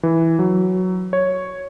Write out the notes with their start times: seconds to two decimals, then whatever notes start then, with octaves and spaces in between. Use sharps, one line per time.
0.03 E3
0.39 F#3
1.13 C#5